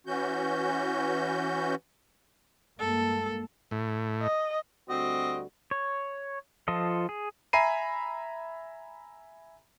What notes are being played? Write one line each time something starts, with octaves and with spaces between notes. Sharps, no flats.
E3 C#4 F#4 G6
G2 G#3 A#3 A4
A2
D#5
D2 G3 C4 F#4 D#5
C#5
F3 F4 A4 D#5
G#4
E5 G#5 A#5 B5 C7 D#7